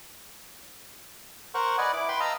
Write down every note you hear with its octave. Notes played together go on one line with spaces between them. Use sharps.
A#4 C5 F#5 C#6
B4 D5 D#5 F#5 G#5
E4 D6
B4 G5 B5 C6
D#5 F5 A5 A#5 D#6 E6